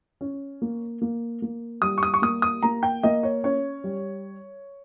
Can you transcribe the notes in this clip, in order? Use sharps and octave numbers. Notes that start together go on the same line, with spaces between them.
C#4
A#3
A#3
A#3
G3 D#6
C#6
D#6
C#6
A#3 D#6
D#6
A#3 A#5
G5
A#3 D#5
C#5
C#4 C#5
G3